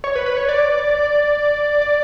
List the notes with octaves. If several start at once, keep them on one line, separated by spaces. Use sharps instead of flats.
C#5
B4
B4
C#5
D5
D5